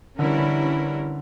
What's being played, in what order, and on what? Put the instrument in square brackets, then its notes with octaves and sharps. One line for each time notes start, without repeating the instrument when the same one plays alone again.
[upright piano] D3 [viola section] E3 G3 C#4 E4 A#4
[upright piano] D3